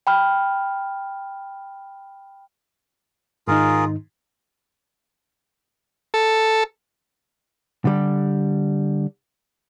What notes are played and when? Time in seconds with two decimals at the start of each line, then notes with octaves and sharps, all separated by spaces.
0.07 G5 B5 F6
3.47 G#2 D#3 D#4 F4 G#4 A#4
6.14 A4
7.85 D3 G3